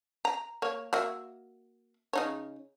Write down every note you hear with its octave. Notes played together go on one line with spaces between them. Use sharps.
A#5
A#3 C#5
A#3 F#4 E5
C#3 D#4 C#5